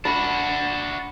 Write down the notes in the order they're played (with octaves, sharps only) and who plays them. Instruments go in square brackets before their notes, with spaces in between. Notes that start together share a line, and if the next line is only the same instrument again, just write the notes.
[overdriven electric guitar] D4 F#4 [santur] B5